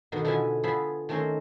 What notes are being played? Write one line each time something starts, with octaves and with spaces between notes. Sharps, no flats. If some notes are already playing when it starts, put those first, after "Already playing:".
B2 D3 D#3
B2 D3 F3 E4 E5 G#5
F3 B3 G#4 E5 B5
D#3 A3 C4 C#4 A#4 C5